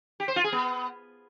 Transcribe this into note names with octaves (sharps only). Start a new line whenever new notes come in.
G4
C5
F4
G#4
B3